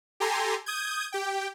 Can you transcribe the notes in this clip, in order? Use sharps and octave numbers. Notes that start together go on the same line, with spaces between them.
G4 A4 G#5 A#5 C6
D#6 G6 G#6
G4 G5